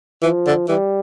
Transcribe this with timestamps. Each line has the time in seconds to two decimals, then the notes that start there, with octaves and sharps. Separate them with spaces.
0.22 E3 F3
0.46 D3
0.68 E3 G3